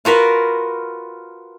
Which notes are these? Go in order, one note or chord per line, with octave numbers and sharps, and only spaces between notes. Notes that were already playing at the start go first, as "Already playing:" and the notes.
F4 F#4 A#4 B4